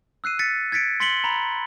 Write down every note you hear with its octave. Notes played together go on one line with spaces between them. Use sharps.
E6 F#6 C7 D#7
A6 B6 C#7
G#6 A6 B6 C#7 D7
C6 A6 B6 C#7 F#7 G7
A#5 B5